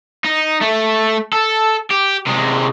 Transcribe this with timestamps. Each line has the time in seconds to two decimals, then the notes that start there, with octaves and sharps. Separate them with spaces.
0.25 D#4
0.62 A3
1.33 A4
1.90 G4
2.27 C3 G#3